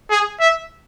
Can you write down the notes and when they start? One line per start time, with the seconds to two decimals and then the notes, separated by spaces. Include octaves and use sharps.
0.10 G#4
0.40 E5